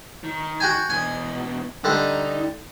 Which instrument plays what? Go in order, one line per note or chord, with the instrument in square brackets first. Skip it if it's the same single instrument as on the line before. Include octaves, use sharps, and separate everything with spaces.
[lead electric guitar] D#3
[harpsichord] F#4 G5 G#5
[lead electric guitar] E2 B2 [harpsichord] G#5
[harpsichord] D3 G3 [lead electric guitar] D#4